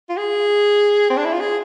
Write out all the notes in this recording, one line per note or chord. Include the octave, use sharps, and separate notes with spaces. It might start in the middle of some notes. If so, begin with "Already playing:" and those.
F4
G#4
C4
D4
E4
F4
G#4